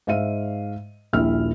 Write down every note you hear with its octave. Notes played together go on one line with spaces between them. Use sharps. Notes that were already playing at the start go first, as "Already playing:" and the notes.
G#2 E5 F5 D#7
D#1 A#1 A#2 E4 E5 F6